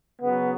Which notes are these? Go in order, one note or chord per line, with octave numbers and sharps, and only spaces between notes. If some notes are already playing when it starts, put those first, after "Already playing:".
C#3 F#3 B3